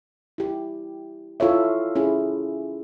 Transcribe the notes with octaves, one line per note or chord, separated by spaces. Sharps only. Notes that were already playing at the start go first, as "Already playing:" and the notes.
E4 G4
E4 F4 A4 C#5 E5
C#4 E4 G#4